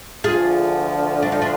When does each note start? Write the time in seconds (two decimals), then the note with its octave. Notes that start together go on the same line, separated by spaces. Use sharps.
0.24 D2 D3 F3 F4 G#4
1.22 D4
1.32 D#4
1.41 D4 F4